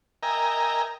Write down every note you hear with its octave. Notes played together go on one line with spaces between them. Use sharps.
A#4 D#5 E5 G5 G#5 A#5